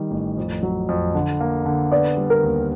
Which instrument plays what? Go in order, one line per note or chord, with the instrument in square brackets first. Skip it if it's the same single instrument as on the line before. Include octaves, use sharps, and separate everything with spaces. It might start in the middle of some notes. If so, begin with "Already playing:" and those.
Already playing: [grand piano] D#3 G3
A1
F2
F#3
F2
D3
A#3
D3
[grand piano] B3 [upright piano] D5
[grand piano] G3
[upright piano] A#4
[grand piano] D#2